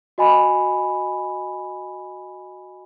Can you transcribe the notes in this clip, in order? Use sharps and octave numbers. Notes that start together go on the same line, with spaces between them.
F#4 D#5 G#5 B5